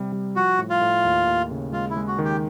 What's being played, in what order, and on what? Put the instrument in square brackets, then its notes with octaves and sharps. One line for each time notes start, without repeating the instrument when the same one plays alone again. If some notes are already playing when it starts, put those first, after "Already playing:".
Already playing: [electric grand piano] C3 G3
G3
[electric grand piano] F3 [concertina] F#4
[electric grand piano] A2
[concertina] F4
[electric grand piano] A2
D#2
D#2
C#3
[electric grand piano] G#3 [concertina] F4
[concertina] E4
[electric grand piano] G#3
[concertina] F#4
[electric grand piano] D#3
[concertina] G4